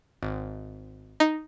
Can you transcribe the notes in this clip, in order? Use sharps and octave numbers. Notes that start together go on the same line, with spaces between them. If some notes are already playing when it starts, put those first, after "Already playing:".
G#1
D#4